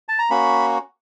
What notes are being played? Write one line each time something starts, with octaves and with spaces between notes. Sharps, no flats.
A5
A#5
A#3 C#4 F#4 B5